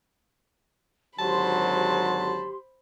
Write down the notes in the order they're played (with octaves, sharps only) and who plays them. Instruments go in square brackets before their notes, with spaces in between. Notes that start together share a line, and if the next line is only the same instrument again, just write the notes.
[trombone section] G#1 D3 F#3 [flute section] G4 C6 [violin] C5 B5 [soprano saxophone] A5